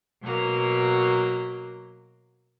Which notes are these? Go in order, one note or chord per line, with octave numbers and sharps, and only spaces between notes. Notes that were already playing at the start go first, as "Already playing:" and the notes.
B2 F#3 A#3